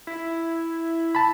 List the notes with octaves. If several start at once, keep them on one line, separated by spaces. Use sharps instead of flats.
E4
A5 B5